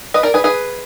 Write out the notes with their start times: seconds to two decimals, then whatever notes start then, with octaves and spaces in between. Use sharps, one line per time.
0.14 B4 D#5
0.23 A#4 D5
0.34 G#4 B4
0.44 G#4 B4